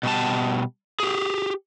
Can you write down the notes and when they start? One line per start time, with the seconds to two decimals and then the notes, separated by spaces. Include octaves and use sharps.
0.03 B2 G3 A5
1.00 G4 G#4